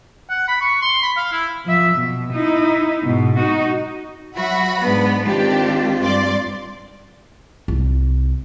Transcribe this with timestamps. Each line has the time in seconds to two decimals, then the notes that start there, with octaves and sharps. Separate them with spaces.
0.30 F#5
0.48 B5
0.61 C#6
0.82 C6
1.02 B5
1.17 F5
1.32 E4
1.65 F3 E5
1.95 B2
2.33 D#4 E4
3.04 G#2 B2
3.38 D#4 F#4
4.36 F#3 F#4 E5 F#5 B5
4.81 G#2 G#3 B3 D4 B4
5.26 D#3 G#3 C4 D4 F4 G4
6.02 G2 D5 C6
7.68 C2